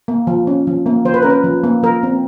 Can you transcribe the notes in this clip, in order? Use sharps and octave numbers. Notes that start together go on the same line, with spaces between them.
A#3
F3
C#4
F3
A#3
F3 C5
B4
C#4 A#4
B4
F3
A#3
F3 A#4
C4